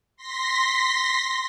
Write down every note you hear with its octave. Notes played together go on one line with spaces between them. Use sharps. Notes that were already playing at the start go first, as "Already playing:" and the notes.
C6 A#6 B6